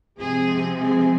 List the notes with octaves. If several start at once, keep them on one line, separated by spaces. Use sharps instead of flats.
C3 F3 G#3 C4 G#4
G#4